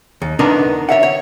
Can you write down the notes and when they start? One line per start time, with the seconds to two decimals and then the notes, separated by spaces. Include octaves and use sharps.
0.22 D#2
0.39 B3 D4 D#4 A#4
0.89 C#5 E5 F#5
1.03 C#5